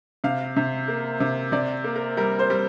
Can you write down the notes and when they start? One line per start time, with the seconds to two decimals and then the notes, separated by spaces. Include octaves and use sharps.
0.24 C3 F5
0.56 C3
0.88 A#3
1.20 C3
1.52 C3 D5
1.84 A#3
1.96 A#4
2.17 G3 A#4
2.39 C5
2.50 G3